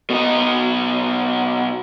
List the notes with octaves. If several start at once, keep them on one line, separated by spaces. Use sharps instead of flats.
B2 D#4